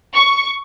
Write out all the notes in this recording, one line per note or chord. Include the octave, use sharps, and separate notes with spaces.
C#6